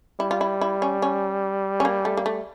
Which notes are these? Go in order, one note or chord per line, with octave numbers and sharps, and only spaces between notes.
G3 E4
F4
E4
E4
C#4
C#4
C#4
A#3
A3
A#3
A3